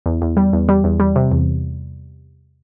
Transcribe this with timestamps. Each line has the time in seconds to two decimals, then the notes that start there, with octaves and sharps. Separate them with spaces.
0.06 E2
0.22 E2
0.37 G3
0.53 E2
0.69 G3
0.84 E2
1.00 G3
1.16 C3
1.32 E2